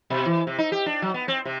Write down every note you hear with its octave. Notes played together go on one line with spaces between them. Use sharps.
B2
E3
C3
D#4
G4
D4
F#3
B3
C4
C3